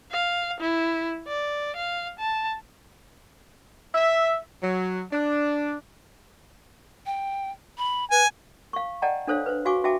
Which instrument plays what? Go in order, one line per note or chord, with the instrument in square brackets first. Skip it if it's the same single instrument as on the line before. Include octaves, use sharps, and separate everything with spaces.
[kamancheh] F5
E4
D5
F5
A5
[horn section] E5
F#3
D4
[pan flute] G5
B5
[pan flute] B4 [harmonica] G#5
[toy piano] F5 C#6
D5 D#5 F#5 G5 A5 A#5
D4 A4 C5 C#5 F5
B4 C5
F#4 F5 G#5 C#6 D6
F#4 E5 G5 A5 D6